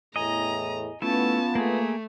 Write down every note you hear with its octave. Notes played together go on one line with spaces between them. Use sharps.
E2 A2 D#5 G#5 A#5
A3 B3 C#4 E4 F4 A5
A3 A#3 G#4